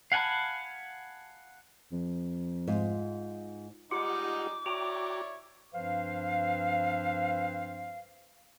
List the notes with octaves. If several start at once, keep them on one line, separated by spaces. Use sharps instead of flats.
F5 F#5 G#5 A5 B5
F2
G#2 F4
G3 G#3 D#4 F4 G4 F#5 D6
E4 F#4 C#5 D5 G5 A#5
G2 F3 C4 B4 C5 F5